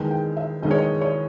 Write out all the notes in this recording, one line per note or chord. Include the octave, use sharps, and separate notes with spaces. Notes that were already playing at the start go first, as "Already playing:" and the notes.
Already playing: E2 D#3 G#3 G5
G5
E5
E2 D#3 G#3 D#5
C#5
D#5
C#5